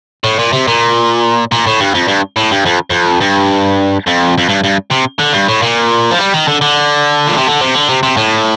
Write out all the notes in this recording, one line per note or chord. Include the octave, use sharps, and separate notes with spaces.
A2
A#2
C3
A#2
A#2
A2
G2
F2
G2
A2
G2
F2
F2
G2
F2
F2
G2
G2
C3
D3
G2
A2
A#2
F3
G3
D#3
D3
D3
A#2
C3
D3
C3
D3
C3
C3
A2